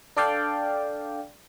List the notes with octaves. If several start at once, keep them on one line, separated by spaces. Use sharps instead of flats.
D4 A4 D5 F5 G5